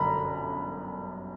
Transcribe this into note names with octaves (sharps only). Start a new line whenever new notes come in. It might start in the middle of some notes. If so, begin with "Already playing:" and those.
Already playing: G1 F#2 D3 A#5 B5